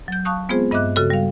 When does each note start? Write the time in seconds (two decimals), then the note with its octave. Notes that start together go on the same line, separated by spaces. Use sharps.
0.08 F#3 G6
0.25 F5 A5 C#6 D#6 F#6
0.49 G#3 B3 C4 F4 G#4 C5
0.71 G2 D#5 E5 D6 F#6
0.96 C#3 F#4 A4
1.10 G3 F5